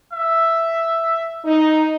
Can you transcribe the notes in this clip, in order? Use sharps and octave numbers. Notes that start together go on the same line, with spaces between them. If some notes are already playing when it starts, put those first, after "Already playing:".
E5
D#4